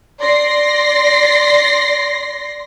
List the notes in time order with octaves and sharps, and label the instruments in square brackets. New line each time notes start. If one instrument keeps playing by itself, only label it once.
[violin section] D5 C6 A#6 C7